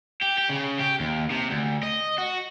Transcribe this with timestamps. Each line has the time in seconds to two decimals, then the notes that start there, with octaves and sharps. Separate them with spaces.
0.22 G4
0.38 G4
0.49 C#3
0.80 G4
1.00 D#2
1.31 C3
1.50 D2
1.83 D#5
2.18 F#4